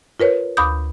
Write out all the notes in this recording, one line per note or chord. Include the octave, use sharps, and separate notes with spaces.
F4 A#4 B4 C#5
D2 B5 D6 D#6 G6